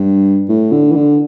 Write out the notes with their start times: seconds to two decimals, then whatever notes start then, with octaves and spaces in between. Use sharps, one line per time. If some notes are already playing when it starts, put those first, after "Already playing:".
Already playing: G2
0.48 A2
0.72 D3
0.91 E3
0.96 D3